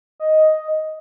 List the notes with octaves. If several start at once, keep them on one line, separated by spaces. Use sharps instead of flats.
D#5